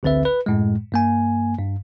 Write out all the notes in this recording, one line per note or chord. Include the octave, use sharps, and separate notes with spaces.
A1 D2 D3 C4 B4 E5
B4
F#2 A2 G#3
G2 A#3 G#5
G2